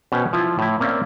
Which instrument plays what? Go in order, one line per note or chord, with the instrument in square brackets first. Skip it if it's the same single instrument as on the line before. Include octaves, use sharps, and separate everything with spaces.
[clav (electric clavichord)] B2 C#4 B4 C5 G5 G#5
F3 E4 F4
A2 E4
A#3 C4 C#4 D5 E5 F5